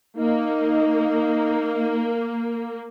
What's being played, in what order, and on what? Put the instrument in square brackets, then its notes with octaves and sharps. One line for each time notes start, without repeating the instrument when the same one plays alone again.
[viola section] A#3 [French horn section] D#4